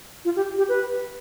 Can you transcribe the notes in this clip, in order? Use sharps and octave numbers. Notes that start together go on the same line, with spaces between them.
F4
G4
G4
B4